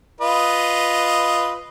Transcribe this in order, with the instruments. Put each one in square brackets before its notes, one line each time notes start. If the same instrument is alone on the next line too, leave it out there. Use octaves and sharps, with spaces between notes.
[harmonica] F4 B4 D#5